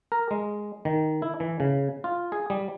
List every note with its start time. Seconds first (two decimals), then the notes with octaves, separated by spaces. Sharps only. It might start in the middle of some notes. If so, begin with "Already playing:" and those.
0.12 A#4
0.31 G#3
0.85 D#3
1.22 E4
1.40 E3
1.60 C#3
2.04 F4
2.32 G#4
2.50 G3